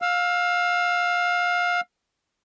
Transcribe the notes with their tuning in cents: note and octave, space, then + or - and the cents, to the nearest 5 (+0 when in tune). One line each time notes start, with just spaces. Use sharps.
F5 +25 E6 +30